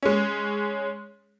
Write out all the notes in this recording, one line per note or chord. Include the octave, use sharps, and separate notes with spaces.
G#3 C#4